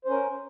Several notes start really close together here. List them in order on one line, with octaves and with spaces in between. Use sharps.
C5 C#4 A#4